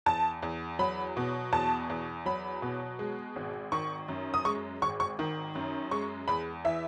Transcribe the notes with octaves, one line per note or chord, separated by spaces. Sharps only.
E2 A5
E2
F#3 B5
B2
E2 A5
E2
F#3 B5
B2
G#3
G#1
D#3 C#6
F#2
D#6
G#3 C#6
G#1 C#6
C#6
D#3
F#2
G#3 C#6
E2 B5
E3 E5